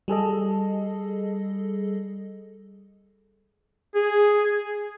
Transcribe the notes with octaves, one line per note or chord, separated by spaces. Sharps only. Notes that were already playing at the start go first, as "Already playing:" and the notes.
G3 G#4 A4 D#5
G#4